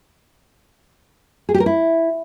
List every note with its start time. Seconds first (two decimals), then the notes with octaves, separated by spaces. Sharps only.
1.49 G#4
1.54 G4
1.60 A#4
1.66 E4